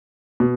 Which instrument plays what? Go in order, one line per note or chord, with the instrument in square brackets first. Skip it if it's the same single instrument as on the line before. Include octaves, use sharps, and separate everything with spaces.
[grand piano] B2